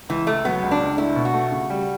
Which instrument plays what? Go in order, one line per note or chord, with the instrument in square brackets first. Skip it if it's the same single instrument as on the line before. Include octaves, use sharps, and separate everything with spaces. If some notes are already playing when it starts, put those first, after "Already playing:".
[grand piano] C#2 [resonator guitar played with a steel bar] E3
[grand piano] C#2 [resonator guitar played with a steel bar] A3
[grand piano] F#3 [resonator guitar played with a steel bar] B3
[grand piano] C#2
[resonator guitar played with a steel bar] D4
[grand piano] C#2
[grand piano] A3 [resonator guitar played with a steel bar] E4
[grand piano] B2
[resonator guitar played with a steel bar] F#4
[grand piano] A3
C#3
G3